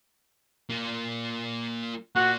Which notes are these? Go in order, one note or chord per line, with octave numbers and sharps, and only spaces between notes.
A#3 F4
A#3 F4 F#4